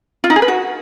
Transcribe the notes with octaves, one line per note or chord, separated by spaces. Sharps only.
F4
D#4
G#4
B4
F#4